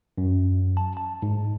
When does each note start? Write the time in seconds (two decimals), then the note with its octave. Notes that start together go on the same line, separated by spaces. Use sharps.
0.18 F#2
0.77 A5
0.97 A5
1.22 G#2